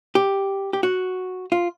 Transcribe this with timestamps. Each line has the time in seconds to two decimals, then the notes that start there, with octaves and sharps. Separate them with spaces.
0.15 G4
0.73 G4
0.83 F#4
1.52 F4